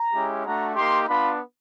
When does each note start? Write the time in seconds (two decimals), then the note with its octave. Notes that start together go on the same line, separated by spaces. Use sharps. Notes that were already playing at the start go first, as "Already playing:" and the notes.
Already playing: A#5
0.14 G#3 C#4 E4 G4
0.45 A3 D4 F#4 A#5
0.76 A#3 D#4 G4 C6
1.07 B3 D4 F4 B5